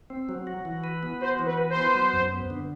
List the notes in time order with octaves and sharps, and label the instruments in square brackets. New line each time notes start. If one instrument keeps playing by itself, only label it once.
[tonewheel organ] C4
F#3
F#4
E3
B4
B3
[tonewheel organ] F#4 [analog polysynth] C5
[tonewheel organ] E3
[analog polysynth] B4
[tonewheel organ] B4
[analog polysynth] C5
[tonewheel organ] B3
F#3
F#2
B3
D3